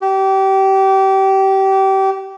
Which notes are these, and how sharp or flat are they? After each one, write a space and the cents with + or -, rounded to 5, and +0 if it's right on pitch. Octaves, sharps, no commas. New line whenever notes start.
G4 -25